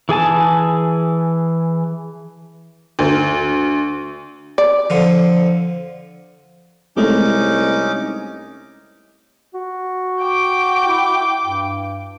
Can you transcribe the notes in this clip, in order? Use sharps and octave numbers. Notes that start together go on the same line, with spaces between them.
E3 G#4 G#5 A5
D2
D5
F2 D3 F3
C2 G#3 A3 C#4 D#4 D6
F#4
G5 D6
E4
G2